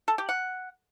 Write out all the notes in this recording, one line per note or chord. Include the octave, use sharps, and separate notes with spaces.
A4
G4
F#5